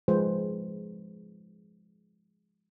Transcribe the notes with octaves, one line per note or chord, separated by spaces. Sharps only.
F3 G#3 B4 C5